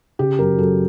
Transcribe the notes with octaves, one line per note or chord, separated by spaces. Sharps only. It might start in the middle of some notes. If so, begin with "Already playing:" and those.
C#3 G4
F#2 A#4
F#2 A4